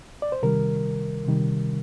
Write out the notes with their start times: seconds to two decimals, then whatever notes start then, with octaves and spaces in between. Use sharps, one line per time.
0.22 D5
0.32 C5
0.43 C3 D#3 G3 A#4
1.27 C3 D#3 G3